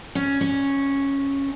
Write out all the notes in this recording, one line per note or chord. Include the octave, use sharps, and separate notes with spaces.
C#4
C#4